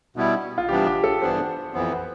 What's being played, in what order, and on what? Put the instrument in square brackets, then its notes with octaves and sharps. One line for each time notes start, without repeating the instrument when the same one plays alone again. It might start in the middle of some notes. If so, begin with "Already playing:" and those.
[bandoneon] B2 G3 B3 E4
[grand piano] F4
[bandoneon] C3 E3 G3 B3 D4 [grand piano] G4
[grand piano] G4
A4
[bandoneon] G2 E3 B3 D4 [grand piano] C5
[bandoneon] F2 E3 B3 [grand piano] C5
[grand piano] B4